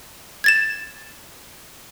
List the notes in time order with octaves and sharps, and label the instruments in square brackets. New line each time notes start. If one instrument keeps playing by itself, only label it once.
[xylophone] G#6 A6 E7